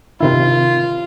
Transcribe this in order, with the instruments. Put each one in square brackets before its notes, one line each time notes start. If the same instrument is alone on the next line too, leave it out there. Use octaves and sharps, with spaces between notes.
[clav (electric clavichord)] C3 D#3 E4 [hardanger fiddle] F4